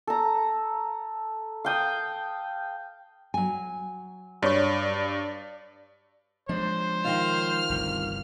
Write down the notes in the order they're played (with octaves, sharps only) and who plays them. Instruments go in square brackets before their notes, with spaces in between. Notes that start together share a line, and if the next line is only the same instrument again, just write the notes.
[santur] A4 A#5
F5 G5 D#6
[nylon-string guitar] F#3 G#5
[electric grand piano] G2 [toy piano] F#4 C#5 C#6 [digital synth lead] D5
[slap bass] F3 G#3 [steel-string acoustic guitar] D4 [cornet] C5
[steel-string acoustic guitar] D#3 F4 [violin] F6
[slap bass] G1 C2